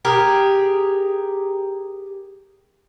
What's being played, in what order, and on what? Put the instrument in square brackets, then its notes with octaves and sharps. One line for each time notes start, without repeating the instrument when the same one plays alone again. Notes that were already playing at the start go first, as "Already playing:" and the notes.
[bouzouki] G4 G#4 A#4